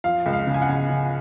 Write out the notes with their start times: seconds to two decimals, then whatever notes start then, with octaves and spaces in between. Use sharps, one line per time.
0.04 F3 F5
0.26 C#2
0.33 F5
0.47 C#3
0.54 G#5
0.62 F#5
0.69 C#3
0.90 C#3